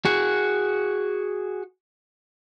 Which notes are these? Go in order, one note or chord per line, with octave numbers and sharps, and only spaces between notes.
F#4 G#4